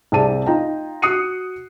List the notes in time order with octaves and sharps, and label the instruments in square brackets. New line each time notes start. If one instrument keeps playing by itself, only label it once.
[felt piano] C2 C4 G#4 D5 A5 D#7
D#4 F4 G5 A#5
F#4 D#6 F#6 C7 C#7 D#7